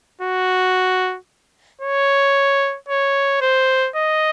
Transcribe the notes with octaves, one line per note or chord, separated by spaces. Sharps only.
F#4
C#5
C#5
C5
D#5